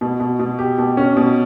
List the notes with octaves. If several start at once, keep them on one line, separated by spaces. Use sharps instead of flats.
B2
B2
B2
G4
B2
C#4
B2